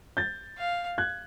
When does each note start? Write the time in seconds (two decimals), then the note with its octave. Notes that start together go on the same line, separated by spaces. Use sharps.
0.17 G6 A6
0.58 F5
0.98 F#6 G#6